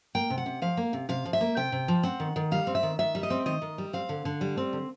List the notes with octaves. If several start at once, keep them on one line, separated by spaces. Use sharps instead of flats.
A#3 G5
C3
F#5
C3
F3 F5
A#3
C3
C3 F5
F3
E5
A#3
C3 G5
C3
F3
C4 F#5
D#3
D#3
G3 F5
C4
E5
D#3
D#3 E5
G3
D#5
C4
D#3 D#5
D#3
G3
C4 F5
D3
D3
G3
C4
D3